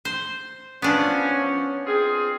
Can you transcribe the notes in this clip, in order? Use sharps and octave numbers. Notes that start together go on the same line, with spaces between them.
C5
F3 B3 C#4 D4
C4 F4 G#4